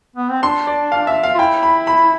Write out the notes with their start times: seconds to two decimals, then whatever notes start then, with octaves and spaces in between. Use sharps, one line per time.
0.16 B3
0.30 C4
0.43 D4 C6
0.67 D5
0.92 F5
1.07 E5
1.23 F5
1.35 F4
1.39 E4 G5
1.63 B5
1.87 B5